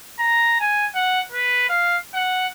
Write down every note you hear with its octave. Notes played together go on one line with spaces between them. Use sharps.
A#5
G#5
F#5
B4
F5
F#5